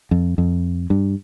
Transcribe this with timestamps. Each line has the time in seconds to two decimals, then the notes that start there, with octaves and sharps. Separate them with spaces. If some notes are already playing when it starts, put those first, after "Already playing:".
0.11 F2
0.38 F2
0.90 G2